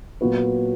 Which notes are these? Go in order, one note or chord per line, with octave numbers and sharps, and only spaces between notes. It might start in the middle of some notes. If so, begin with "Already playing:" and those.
A#2 F#3 B3 F#4 B4